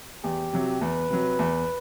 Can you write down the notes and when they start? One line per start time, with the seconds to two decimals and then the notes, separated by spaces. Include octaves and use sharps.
0.24 E2 G4
0.53 C3 F#3
0.81 E2 B4
1.10 C3 F#3
1.39 E2